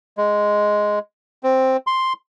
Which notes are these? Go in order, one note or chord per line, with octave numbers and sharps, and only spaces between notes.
G#3
C4
C6